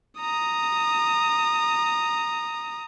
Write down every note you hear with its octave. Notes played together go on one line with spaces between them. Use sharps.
A#5 D#6